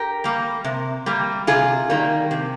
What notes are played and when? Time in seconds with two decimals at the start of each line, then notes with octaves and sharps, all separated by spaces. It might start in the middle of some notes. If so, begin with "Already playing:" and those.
Already playing: G4 A#4
0.24 G3 A#3
0.64 C3
1.06 G3 A#3
1.47 C3 F4 G#4
1.90 D#3 G3 A#3
2.31 C3